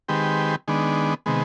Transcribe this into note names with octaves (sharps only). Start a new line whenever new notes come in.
D#3 G#3 C4 G4 B4
D#3 G#3 B3 D4
C3 D#3 G#3 B3